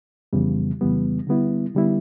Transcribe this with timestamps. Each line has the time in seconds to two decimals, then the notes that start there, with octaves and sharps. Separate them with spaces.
0.33 F2 C#3 E3 G3 B3
0.81 F2 C#3 E3 G3 B3
1.27 D3 G3 B3 E4
1.75 D3 G3 B3 E4